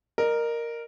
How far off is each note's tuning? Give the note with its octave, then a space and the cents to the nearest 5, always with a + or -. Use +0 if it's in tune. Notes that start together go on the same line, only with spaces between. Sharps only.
A#4 +0 D#5 -35